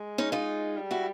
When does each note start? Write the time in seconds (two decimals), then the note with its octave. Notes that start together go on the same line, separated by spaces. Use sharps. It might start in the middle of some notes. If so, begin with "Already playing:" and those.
Already playing: G#3
0.18 C#4 D#4
0.32 D#4 F4
0.77 G3
0.91 E4 F#4